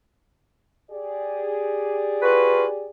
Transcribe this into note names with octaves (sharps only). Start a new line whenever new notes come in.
G4 G#4 D5
F4 F#4 B4